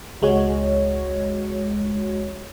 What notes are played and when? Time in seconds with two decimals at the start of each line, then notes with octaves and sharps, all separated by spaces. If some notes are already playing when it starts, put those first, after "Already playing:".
0.22 C#2 G#3 F#4 C#5